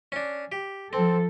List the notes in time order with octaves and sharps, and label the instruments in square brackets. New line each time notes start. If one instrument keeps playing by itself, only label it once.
[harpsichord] C#4 D4
G4
[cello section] F3 A4 [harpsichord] C4